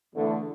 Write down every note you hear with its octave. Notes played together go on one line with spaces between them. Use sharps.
E2 D3 A3